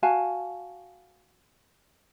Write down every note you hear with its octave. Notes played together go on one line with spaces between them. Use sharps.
F#4 F5 G#5 A5